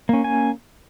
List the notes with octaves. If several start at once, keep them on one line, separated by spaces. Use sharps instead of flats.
A#3 C#4
G#5